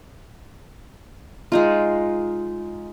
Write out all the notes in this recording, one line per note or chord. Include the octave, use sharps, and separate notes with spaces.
G#3 D#4 F4